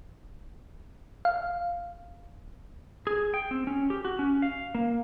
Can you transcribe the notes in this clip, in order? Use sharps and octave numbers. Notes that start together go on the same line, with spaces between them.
F5
G#4
G5
C4
C#4
G4
F#4
C#4
F5
A#3